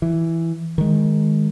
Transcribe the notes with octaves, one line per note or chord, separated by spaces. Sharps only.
E3
D#3 G#3